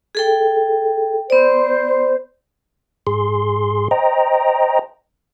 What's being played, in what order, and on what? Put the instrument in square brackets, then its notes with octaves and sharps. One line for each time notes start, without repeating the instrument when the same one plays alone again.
[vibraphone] G#4 A4 G5
[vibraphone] B3 D5 [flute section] C5
[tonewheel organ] G#2 G#4 C6
C5 D#5 G5 A#5